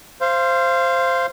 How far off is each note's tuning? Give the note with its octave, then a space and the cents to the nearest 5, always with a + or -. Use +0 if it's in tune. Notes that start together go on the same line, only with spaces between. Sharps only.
C5 +0 F5 -25